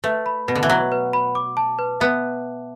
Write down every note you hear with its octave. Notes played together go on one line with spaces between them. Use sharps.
A3 B4
B5
B2 B4
D3
E3
F#3 F#5
B4
B5
D6
A5
B4
B3 E5